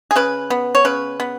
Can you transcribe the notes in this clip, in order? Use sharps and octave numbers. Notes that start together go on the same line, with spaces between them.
G#4
C#3 B4
B3
C#5
C#3 B4
B3